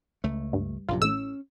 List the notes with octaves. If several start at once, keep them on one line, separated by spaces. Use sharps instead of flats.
C#2 A3
G2
A#1 F#2 C3 F4
A1 A2 C#4 E6